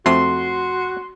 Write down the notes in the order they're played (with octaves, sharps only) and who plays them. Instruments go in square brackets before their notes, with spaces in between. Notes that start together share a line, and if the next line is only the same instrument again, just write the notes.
[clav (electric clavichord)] F2 A3 C4 [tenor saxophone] F#4 [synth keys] C6